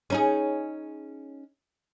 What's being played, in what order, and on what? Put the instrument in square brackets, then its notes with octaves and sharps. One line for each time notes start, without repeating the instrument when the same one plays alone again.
[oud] C#4 D#4 G#4